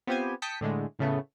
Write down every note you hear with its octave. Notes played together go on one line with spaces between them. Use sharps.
B3 C4 F4 G4 C5 G#5
G5 A5 D#6 B6 C#7
A2 D3 G#3 A3
A2 C#3 A3 B3